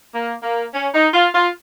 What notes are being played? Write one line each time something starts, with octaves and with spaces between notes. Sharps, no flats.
A#3
A#3
C#4
D#4
F4
F4